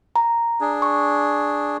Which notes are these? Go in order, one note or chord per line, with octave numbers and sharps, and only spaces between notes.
A#5
D4 G#4
C#6